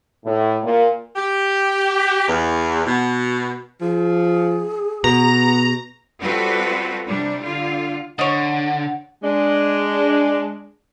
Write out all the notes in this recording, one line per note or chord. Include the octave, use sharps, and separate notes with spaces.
A2
A#2
G4
E2
B2
F3 G#4
B2 B3 A#5
G3 C4 F4 F#4 A4 B4
C3 G3 D4
D3 F4
D3 C#5 D#5 F#5
G#3 D4